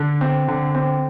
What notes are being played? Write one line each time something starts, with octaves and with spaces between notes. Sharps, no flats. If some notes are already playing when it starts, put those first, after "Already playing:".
Already playing: D3
C4
D3
C4